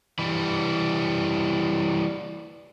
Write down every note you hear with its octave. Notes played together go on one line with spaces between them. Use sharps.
E3 G3